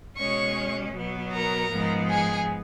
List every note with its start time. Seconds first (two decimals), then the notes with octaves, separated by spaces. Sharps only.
0.17 B2 G#3 C#4 C#5 C#6
0.94 B2 F#3 B3
1.32 A#4 A#5
1.71 G#2 F3 G#3 B3
2.09 G#4 G#5